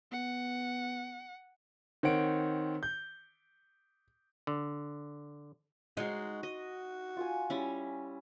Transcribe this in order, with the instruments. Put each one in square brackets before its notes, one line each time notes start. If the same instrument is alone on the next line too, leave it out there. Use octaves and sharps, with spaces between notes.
[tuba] B3 [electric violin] F#5
[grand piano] D#3 C4 C#5 F#5 D7
G6
[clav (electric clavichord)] D3
[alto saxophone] G#3 [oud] D#4 [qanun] F#4 C6
[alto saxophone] F#4 [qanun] D#5
[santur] F4 F5 G#5
[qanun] G3 C#4 [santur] E4